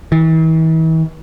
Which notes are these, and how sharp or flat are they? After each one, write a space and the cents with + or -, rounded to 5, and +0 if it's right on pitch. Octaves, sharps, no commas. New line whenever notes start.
E3 -45